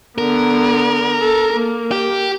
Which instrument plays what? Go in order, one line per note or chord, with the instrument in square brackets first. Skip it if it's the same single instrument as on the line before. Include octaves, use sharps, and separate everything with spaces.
[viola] D3 B3 [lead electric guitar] A#4
[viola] A4
A#3
[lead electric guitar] G4